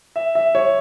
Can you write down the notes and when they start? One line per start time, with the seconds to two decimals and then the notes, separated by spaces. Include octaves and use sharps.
0.16 E5
0.35 E5
0.55 C#5